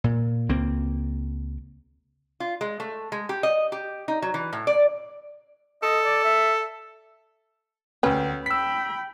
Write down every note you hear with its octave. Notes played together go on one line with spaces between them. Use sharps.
A#2
C#2 A#3 C4
F4
G#3
A3
G#3
G4
D#5
G4
D#4
F#3
E3
A2
D5
A4 D#5
D5
E5
D2 C#4 B4 G5
G5 B5 E6 B6